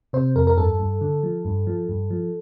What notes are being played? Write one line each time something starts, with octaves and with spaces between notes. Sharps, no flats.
C3 C5
F2 A#4
A#4
G2 A4
G2
D3
F3
G2
F3
G2
F3